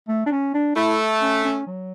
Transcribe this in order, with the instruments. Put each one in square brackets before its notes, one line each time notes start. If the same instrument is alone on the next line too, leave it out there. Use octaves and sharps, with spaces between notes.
[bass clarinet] A3
D4
C#4
D4
[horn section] A3 [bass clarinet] E4
[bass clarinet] C#4
C#4
F#3